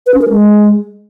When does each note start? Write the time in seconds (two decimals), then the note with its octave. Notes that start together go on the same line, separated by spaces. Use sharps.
0.06 B4
0.14 C#4
0.22 A#4
0.29 G#3